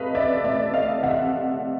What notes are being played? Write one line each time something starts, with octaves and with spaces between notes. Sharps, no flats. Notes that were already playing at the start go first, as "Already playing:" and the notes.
Already playing: C3 A3 B4 D#5 F5
C#4 D5 E5
A3 D5 E5
A3 D#5 F5
C3 E5 F#5